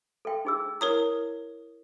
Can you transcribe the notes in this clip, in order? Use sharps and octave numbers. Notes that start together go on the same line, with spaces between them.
A4 G5
D#4 G#4 E6
E4 A#4 C#5 D#6